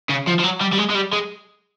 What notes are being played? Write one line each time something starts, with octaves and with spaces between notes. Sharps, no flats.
C#3
F3
F3
F#3
G3
G3
G#3
G#3
G3
G#3